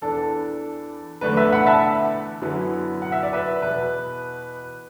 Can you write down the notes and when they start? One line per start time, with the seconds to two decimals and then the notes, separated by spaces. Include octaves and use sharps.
0.02 E2 E3 D4 A4
1.21 E2 D3 A3 D4 B4
1.37 B4 E5
1.52 F#5 B5
1.66 E5 A5
2.41 F#2 D3 F#3 B3 E4
3.02 F#5
3.12 E5
3.23 D5
3.33 B4 E5
3.62 E2 B2 B3 B4